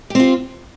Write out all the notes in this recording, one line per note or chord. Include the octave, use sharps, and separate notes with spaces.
C4 F4 G4